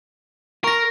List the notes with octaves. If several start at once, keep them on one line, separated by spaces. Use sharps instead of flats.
A#4 C#6 A#6